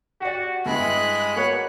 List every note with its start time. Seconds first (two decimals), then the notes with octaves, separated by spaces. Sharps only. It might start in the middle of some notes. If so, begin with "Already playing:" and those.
0.21 F#4 G4 D5
0.66 G2 G#3 E4 B5 F#6
1.36 A#3 F#4 B4 C#5